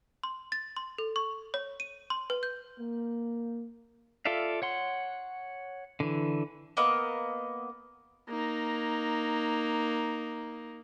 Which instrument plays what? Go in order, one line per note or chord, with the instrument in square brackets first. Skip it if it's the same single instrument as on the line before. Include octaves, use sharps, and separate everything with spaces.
[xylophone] C6
A6
C6
A4
C#6
C#5
D#7
C6
B4
G6
[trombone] A#3
[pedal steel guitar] F4 A4 D5 E5 F5
C#5 F#5 C6
D3 E3
[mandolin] A#3 B3 D#5
[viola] A#3 D#4